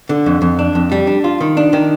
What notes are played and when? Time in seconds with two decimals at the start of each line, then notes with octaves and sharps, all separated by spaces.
0.09 D3
0.26 F2
0.42 F2
0.59 D4
0.75 F2
0.92 G3
1.07 D4
1.24 F4
1.41 D#3
1.57 D4
1.73 D#3